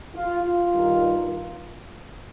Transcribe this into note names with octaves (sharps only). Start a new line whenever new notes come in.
F4
F4
G2 D#3